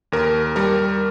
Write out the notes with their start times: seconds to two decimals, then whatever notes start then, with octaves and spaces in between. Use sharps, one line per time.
0.12 D#2 A#4
0.56 G3 A#4